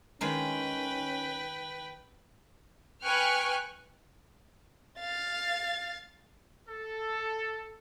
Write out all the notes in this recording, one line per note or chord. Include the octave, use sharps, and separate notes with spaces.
D#3 G#3 A#3 C#4 B4 G5
B4 G5 G#5 C#6 F6 F#6
F5 A6
A4